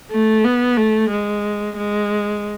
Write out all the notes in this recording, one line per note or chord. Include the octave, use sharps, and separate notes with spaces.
A3
B3
A3
G#3
G#3